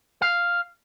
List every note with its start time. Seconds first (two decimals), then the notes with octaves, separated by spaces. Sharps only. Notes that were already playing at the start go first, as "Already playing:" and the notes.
0.22 F5